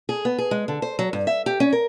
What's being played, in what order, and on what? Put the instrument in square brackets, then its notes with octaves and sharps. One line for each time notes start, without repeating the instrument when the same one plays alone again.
[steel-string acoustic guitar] G#4
B3
G#4
G#3
D3
C5
F#3
G2
E5
G4
C#4
A#4